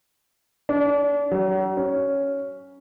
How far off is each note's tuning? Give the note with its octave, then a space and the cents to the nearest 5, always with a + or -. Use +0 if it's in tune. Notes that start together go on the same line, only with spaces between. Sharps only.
D4 -35
F#3 +40
C#4 +5